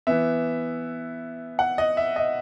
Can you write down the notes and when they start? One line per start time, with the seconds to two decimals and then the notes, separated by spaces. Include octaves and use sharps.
0.07 E3 B3 E5
1.59 F#5
1.78 D#5
1.97 E5
2.16 D#5